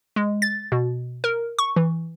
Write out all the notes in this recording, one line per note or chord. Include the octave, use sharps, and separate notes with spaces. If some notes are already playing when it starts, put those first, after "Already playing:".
G#3
A6
B2
A#4
C#6
E3